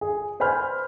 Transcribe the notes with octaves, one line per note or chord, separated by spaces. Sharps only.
G#4
B4 C5 G#5 B5 F6 G6